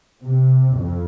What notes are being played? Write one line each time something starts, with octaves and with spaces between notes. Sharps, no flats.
C3
F2